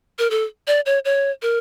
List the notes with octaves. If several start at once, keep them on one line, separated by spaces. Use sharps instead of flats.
A#4
A4
D5
C#5
C#5
A#4